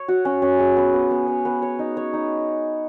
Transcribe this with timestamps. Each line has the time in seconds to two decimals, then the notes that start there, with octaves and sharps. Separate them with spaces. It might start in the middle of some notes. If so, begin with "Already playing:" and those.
Already playing: C#5
0.08 F#4
0.25 C#4
0.42 C#4
0.59 G#4
0.77 B3
0.94 B3
1.11 B3
1.28 C#5
1.45 B3
1.62 C#5
1.79 D#4
1.97 C#5
2.13 D#4